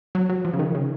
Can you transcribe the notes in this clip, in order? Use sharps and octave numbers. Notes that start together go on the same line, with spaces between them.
F#3
F#3
F3
C#3
D#3
C#3